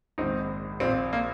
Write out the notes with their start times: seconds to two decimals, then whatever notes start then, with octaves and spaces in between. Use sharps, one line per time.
0.18 A#1 G#2 D#3 C4 D#4
0.80 A#1 A#2 C4
1.13 A#3